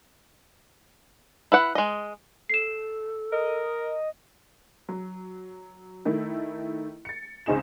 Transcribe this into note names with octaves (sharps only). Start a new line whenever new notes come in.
E4 B4 F#5
G#3 D#5
A4 C7 E7
A#4 D#5
F#3
D#3 A3 E4
A6 C#7
C#2 C4 C#4 D#4 G#4 E7